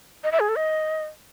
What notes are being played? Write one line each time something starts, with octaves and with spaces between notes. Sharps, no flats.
D#5
E5
G#4
A4
D#5